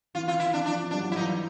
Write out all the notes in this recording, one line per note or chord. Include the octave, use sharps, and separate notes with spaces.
E3 F4
F4
E4
D4
F3 D4
G3 D4
F#3
F3
E4
E3 D#4